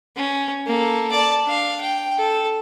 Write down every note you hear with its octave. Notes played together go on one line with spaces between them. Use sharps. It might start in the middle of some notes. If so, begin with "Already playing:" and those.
C#4
A#3 A4
D5 A5
D4 F5
G5
A4